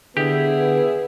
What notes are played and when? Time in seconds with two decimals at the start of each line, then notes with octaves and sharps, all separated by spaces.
0.17 D3 B3 E4 G4 G#4